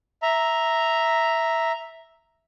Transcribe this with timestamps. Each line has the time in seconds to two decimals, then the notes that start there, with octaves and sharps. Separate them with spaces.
0.22 E5 A#5